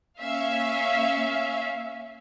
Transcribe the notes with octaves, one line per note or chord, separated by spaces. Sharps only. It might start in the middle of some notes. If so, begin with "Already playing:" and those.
A#3 C#4 E5 F5